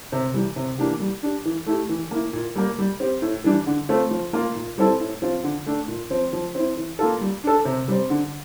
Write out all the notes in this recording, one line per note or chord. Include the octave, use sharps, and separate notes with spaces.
C3
E3 G3
C3
E3 A#3 D4 G4
G3
D4 G4
E3
A3 E4 G4
E3
A#3 E4
A#2
G3 A#3
G3
C4 G4
A2
E3 G3 D4
D3
A3 C4 F4
F3
A#3 F4
A#2
G3 C4 E4 A4
A2
F3 C4 F4
D3
A3 D4
A#2
F3 C4
F3
C4 E4
E3
A#3 F4 A4
G3
D4 A4
C3
G3 C4
D3